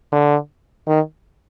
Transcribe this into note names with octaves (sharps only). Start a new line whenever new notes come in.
D3
D#3